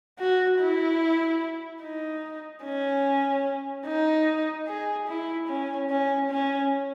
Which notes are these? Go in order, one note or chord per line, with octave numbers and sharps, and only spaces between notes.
F#4
E4
D#4
C#4
D#4
G#4
E4
C#4
C#4
C#4